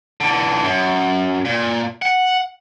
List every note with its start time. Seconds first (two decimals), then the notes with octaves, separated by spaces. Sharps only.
0.21 D3 E3
0.64 F#2
1.45 A#2
2.02 F#5